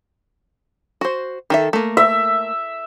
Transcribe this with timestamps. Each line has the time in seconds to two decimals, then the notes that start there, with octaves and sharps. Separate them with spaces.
1.01 F#4 C5
1.50 D#3 A4 E5
1.73 A3 A#3
1.97 E5